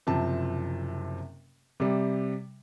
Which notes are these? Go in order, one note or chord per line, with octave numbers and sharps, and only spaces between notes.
F#1 C3 F3 C4 A5
C3 G3